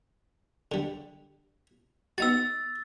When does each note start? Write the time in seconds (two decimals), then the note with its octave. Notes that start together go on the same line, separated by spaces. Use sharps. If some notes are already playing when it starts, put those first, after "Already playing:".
0.72 D3 G3
2.18 B3 D#4 F#4 E6 A6